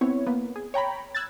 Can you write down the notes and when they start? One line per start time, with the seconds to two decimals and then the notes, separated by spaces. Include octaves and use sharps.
0.01 B3 C4 E4 C#5
0.27 A#3 B3
0.56 G#4
0.74 C#5 G5 A#5 B5
1.15 E6 F#6 G#6 A6